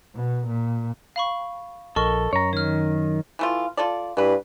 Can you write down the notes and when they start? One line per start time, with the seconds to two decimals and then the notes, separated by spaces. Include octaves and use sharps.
0.15 B2
0.47 A#2
1.16 F5 B5 C#6
1.96 A#1 A4 A#4 D#5 C#6
2.33 F#2 C#5 A#5
2.53 D#3 C#5 F6
3.39 E3 A3 F4
3.77 F4 A4 D5
4.17 G2 E3 B4